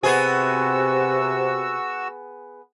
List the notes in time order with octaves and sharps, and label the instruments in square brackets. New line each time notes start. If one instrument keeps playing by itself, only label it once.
[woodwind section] C3 [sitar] B3 G#4 [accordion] F#4 E6